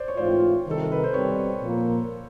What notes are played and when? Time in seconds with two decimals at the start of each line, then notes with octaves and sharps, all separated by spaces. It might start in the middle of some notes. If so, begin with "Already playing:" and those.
Already playing: C5 D5
0.08 C#5
0.17 G#2 E3 A3 C4 F4 C5 D5
0.65 C2 C3 D#3
0.71 A4
0.82 A#4
0.92 B4
1.04 C5
1.13 B2 G3 C4 B4 C#5
1.62 A#2 F3 A#3